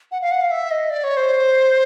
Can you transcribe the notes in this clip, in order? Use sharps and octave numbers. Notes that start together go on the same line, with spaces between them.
F#5
F5
F#5
F5
E5
D#5
D5
C#5
C5